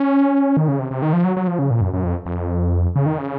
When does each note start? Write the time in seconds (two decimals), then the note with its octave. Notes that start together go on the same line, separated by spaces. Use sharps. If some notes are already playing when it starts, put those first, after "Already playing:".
Already playing: C#4
0.57 D#3
0.68 C#3
0.79 C3
0.91 C3
1.02 D#3
1.13 F3
1.24 F#3
1.37 F#3
1.47 F3
1.59 C#3
1.71 A#2
1.81 F#2
1.93 F#2
2.04 F2
2.26 F2
2.96 C#3
3.06 D#3
3.18 C#3